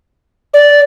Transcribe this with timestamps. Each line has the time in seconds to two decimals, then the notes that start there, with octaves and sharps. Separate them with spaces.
0.54 D5